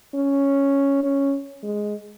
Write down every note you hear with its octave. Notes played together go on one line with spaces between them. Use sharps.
C#4
C#4
G#3